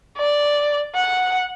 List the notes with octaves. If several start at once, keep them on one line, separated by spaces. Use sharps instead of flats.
D5
F#5